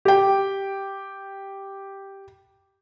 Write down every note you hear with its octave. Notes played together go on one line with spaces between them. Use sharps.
G4 G5